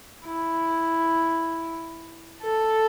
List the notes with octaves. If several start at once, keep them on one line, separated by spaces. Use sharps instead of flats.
E4
A4